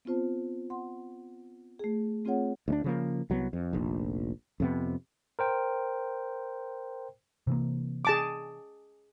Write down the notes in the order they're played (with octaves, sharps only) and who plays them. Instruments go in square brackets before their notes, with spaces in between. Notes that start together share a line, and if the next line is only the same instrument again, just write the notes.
[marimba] B3 C4 F4 C5 A5
F#5 C6
A3 G#4
A3 C4 F4 G#4 C#5 F#5
[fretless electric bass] D2 G#3 D4
C#3 F3 A#3
C2 F#3 G3 B3
F2
F1 A#1
F2 C3 B3
[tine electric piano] A#4 C5 G5
[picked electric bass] C3 E3 A#3
[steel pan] G#4 A5 D6